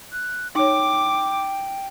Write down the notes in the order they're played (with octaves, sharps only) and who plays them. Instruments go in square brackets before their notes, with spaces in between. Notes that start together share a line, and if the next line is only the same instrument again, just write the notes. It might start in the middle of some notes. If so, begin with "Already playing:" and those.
[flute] F#6
[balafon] D#4 C#5 [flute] G5 [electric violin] D6